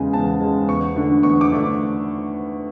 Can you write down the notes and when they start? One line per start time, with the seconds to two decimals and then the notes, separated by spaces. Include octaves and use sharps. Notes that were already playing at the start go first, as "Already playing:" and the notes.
Already playing: E2 C#3 G#3 G#5
0.13 E2 A5
0.41 C#3 G#3
0.68 E2 C#6
0.96 D3 A3 D4
1.23 E2 C#6
1.41 D6
1.51 D3 A3 D4